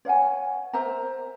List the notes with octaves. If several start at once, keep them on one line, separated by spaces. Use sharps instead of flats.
C#5 F5 F#5 G#5
A#4 C5 E5 A#5